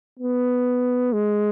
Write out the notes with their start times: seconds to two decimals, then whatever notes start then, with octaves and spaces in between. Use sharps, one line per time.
0.19 B3
1.13 G#3